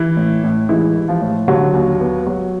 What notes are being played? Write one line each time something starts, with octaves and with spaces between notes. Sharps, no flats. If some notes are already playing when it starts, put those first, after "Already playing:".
Already playing: E3 E4
A2
A2
E3 G#3 E4
E3
F3 F4
A2
D3 F#3 F#4
D#2
B3
F#3